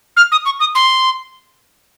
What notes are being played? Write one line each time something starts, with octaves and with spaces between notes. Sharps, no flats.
F6
D#6
C#6
D#6
C6